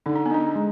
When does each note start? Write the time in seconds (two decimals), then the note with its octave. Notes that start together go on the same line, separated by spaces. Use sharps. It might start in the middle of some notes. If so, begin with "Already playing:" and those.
0.06 D3 D#4
0.15 D4
0.26 B3
0.31 D4 D#4
0.55 G#3